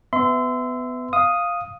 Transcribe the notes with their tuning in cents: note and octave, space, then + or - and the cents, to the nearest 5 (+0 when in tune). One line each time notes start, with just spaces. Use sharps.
B3 +20 E5 +0 C6 -30
F5 +0 D#6 +0